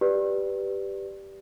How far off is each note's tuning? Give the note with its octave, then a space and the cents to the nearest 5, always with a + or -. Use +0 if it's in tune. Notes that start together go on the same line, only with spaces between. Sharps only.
G4 +0 B4 +0 D5 +0